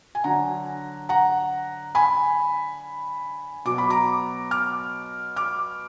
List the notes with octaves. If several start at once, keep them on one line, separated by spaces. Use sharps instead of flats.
G#5
D3 F#3 F#5 A#5
F#5 A#5
G#5 B5
B2 F#3 D6
B5
A#5 D6
D6 F6
D6 F6